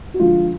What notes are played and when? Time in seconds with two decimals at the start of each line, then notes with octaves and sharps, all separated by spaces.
0.14 F#4
0.19 D3 F3 G#3 F4